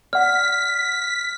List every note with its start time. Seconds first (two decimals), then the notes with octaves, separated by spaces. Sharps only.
0.13 D5 F#5 F6 B6